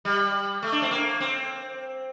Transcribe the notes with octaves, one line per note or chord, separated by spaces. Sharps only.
G3
A3
D4
C4
A#3
C4